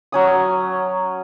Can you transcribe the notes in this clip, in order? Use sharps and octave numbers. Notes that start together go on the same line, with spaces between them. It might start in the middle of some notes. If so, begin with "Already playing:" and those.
F#3 C#4 D#6